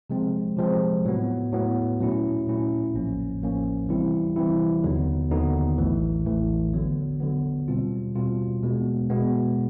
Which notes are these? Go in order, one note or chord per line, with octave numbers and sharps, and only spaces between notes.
C3 F3 G#3 C4
C3 F3 G#3 C4
A2 F#3 B3
A2 F#3 B3
A#2 F#3 A3 C#4 E4
A#2 F#3 A3 C#4 E4
A1 A2 F3 A#3 C#4
A1 A2 F3 A#3 C#4
C3 E3 G3 C4 E4
C3 E3 G3 C4 E4
D#2 D3 F#3 B3 D#4
D#2 D3 F#3 B3 D#4
A1 A2 E3 A3
A1 A2 E3 A3
D3 F#3 B3
D3 F#3 B3
B2 G3 C4 F4
B2 G3 C4 F4
B2 G#3 B3
B2 G#3 B3